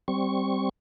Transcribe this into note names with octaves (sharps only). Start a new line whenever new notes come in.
G3 C4 C#6